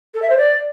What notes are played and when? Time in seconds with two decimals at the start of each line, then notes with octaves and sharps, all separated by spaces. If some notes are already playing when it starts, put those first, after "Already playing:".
0.14 A4
0.22 E5
0.30 C5
0.38 D5